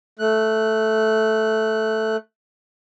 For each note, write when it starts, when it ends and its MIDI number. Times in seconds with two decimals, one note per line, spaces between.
0.19 2.16 57
0.19 2.16 90